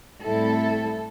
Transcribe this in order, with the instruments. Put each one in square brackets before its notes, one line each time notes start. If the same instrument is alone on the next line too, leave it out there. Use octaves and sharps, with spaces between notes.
[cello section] A2 G3 C4 E4 A4